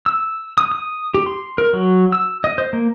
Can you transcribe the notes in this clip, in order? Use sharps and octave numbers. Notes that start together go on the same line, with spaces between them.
E6
D#6
D#6
G4
C6
A#4
F#3
E6
D#5
C5
A#3